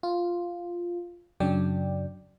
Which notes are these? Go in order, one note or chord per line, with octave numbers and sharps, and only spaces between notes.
F4
F#2 C#3 F#3 D4 D5 G5